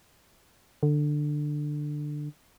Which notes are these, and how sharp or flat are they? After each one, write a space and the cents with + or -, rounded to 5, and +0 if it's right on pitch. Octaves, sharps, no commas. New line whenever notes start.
D3 +15